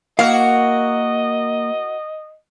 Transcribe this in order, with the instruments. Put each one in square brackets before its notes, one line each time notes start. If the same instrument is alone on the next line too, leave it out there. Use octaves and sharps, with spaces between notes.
[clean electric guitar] A#3 [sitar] E4 F#4 A#4 [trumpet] D#5 [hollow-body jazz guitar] F5